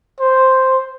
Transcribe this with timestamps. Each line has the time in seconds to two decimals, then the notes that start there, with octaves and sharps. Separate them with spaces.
0.20 C5